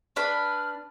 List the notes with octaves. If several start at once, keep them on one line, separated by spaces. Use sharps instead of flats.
D4 B4 B5 F6